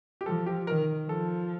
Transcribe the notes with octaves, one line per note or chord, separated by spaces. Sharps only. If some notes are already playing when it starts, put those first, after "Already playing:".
G4
F3 A4
G4
D#3 A#4
F3 A4